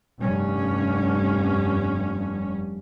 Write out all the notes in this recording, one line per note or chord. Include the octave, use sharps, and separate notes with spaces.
F1 G2 C#4